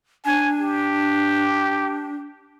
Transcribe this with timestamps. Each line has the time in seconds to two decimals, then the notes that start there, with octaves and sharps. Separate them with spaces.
0.25 D4 G#5
0.61 G4